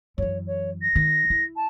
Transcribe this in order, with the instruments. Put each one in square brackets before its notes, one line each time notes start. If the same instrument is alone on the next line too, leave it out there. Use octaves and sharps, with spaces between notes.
[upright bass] F#2 E3 [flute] C#5
[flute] C#5
A#6
[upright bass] D#3
E4
[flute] A5